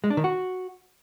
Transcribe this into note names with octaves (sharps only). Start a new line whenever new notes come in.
G#3
D4
D#3
F#4